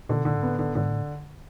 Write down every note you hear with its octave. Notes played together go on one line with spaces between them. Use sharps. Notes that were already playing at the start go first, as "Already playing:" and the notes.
A#2 D3
B2
A#2 D3
G#2
A2 B3
D3
G#2 D3
A2